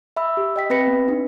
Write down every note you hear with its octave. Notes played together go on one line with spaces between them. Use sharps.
E5 B5 E6
G4
D#5 G5 B6
C4 B4 B5 A#6 C#7
B3 C#7
D4 D#4